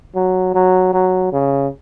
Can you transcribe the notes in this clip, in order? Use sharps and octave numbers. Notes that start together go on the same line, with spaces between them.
F#3
F#3
F#3
C#3